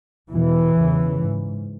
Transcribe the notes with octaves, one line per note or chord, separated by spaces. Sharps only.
E2 B2 E3
E2 C#3
G#2